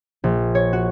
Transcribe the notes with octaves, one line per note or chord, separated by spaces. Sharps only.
A#1
C#5
F#4